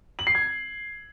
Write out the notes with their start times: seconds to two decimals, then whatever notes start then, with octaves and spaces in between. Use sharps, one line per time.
0.19 F#7
0.27 C7
0.35 G#6